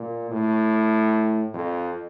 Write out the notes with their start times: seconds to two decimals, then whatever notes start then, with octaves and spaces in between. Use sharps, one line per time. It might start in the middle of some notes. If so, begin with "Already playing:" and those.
Already playing: A#2
0.31 A2
1.54 F2